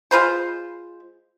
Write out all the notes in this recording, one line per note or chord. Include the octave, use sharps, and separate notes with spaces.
G#3 F4 B4 C5